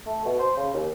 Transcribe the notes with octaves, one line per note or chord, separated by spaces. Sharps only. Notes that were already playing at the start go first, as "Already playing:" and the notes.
A3
B2
C5
C#3
D#2